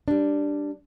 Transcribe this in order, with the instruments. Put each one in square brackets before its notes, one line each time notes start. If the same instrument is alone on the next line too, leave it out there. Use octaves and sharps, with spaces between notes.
[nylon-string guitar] G3 D4